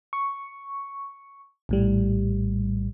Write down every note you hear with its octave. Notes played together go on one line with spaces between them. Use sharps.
C#6
A#1 A2 G3